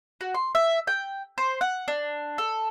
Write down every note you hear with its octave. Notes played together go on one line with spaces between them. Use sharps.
F#4
C6
E5
G5
C5
F#5
D4
A4